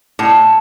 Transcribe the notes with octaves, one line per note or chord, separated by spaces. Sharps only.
A2